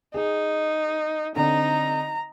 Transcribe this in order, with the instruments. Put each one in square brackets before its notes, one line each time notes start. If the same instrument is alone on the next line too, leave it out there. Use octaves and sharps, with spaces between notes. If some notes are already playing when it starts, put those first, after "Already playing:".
[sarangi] D#4 [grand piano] G#4
[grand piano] D3 C4 [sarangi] D#4 [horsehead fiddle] A#5